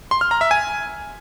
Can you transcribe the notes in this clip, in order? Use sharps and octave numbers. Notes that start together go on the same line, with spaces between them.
C6
F6
A#5
E5
G#5